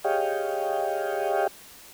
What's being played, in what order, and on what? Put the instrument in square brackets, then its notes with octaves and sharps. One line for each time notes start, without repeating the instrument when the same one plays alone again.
[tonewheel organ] G4 G#4 C#5 D#5 F5 G5